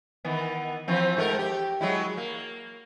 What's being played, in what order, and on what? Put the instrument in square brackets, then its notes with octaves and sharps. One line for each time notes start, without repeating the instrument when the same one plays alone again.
[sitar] D#3 E3 B3
E3 F3 C4
G#2 A3 A#4
G4
F#3 G#3 E4
A#3